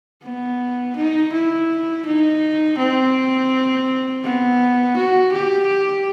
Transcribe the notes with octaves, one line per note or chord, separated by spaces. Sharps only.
B3
D#4
E4
D#4
C4
B3
F#4
G4